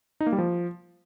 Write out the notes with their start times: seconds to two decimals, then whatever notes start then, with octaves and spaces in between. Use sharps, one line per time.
0.20 D#4
0.26 A#3
0.32 G3
0.38 F3